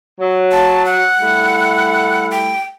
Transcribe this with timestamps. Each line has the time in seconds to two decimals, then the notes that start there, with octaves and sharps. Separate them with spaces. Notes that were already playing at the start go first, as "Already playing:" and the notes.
0.20 F#3
0.51 A5
0.86 F#5
1.20 G3 A3 E4
2.31 G5